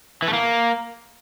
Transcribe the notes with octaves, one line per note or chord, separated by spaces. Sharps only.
E3
A3
A#3